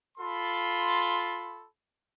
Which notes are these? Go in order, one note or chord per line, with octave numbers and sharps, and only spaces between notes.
F4 A4 B5 C6